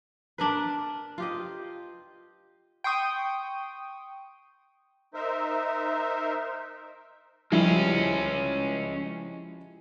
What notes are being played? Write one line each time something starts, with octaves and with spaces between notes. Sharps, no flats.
D4 A#4 B4
F4 G4 D#5
G5 C6 C#6 D#6
D#4 A#4 C5 E5
F3 G3 G#3 C#4 E4